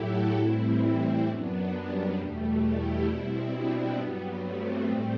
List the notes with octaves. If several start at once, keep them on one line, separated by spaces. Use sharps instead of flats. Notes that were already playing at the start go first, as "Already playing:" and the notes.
Already playing: A2 F#3 E4 F#4 G4 A4
A2 E3 G3 C4 E4
C4 E4
F#2 F#3 B3 D4
G3
E2 B2 G3 A3
E4 G4
B2 G3 C4 E4
B3 D4
G2 F#3 G3 B3
A3 C4
A2 G3 A3 C4